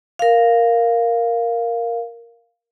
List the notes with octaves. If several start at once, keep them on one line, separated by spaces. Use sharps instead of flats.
A#4 F5